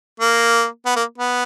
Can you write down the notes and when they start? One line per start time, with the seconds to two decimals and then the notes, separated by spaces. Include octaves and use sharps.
0.20 A#3
0.85 B3
0.96 A#3
1.18 B3